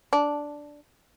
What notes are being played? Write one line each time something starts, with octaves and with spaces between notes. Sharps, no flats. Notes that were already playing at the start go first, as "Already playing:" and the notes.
D4